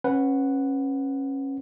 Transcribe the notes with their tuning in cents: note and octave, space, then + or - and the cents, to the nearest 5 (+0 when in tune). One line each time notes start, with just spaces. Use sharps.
C#4 -25 B4 +0 F#5 +0